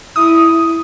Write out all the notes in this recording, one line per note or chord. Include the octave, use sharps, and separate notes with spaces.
E4 D#6